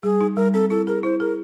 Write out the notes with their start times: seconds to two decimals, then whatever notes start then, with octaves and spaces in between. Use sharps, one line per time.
0.03 G3 G#4
0.21 D#4
0.36 G3 A#4
0.54 C4 A4
0.70 E4 A4
0.87 G#4 A#4
1.03 E4 C5
1.20 G#4 A#4